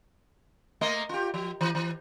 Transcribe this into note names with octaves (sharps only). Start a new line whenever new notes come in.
A3 A#3 D#5
F4 G4
F3
E3
E3